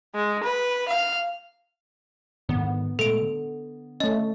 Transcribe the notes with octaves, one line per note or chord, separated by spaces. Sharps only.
G#3
B4
F5
G#2 D3 D#3 B3
A#2 G#3 A3 A4 D7
D3
A3 C#4 D#5